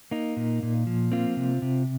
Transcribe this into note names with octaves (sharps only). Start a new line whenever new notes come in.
A#3 D#4
A#2
A#2
F3
A#3 C4 F4
C3
C3